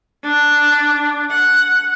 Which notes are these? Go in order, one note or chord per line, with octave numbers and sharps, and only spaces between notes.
D4
F#5